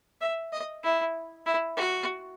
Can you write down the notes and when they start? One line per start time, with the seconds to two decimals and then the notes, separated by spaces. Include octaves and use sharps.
0.21 E5
0.53 D#5
0.84 E4
1.46 E4
1.77 F#4